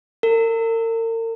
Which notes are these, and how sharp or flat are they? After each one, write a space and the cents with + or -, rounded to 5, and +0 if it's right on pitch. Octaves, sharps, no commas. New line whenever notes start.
A#4 -40